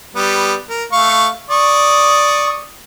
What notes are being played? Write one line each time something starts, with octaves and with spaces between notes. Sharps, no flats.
G3 B3
A#4
A3 F5 C#6
D5 C#6 D#6